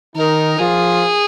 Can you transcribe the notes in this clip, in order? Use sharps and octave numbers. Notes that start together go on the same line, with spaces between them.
D#3 D#4 A#4
F3 F4 G#4